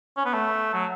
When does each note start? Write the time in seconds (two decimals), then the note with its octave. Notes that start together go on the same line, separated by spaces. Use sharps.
0.17 C#4
0.25 B3
0.34 A3
0.73 F#3